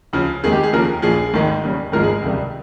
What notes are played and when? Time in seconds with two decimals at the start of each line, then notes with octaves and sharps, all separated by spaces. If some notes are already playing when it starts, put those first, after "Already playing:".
0.13 C#2 C#3 F3
0.43 F2 D#3 G#3 G#4
0.52 G4
0.63 G#4
0.73 D#2 C#3 F3 A#4
1.02 A#1 A#2 F3 G#4
1.34 G#1 G#2 D#3 G#3
1.63 D#2 C#3 G3
1.92 G#1 G#2 F3 G#3 A#4
2.03 G#4
2.22 C#2 C3 D#3 G3